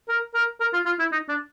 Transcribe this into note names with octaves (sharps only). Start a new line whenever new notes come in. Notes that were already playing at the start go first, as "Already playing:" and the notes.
A#4
A#4
A#4
F4
F4
E4
D#4
D4